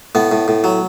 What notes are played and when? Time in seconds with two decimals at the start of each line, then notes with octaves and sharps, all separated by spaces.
0.15 A2 B3
0.32 A2
0.48 A2
0.64 F#3